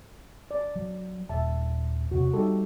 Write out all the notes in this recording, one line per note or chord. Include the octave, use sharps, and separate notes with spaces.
D5
F#3
D#1 E5 A5
E2 C3 F#4
G3 D#4 G4 A4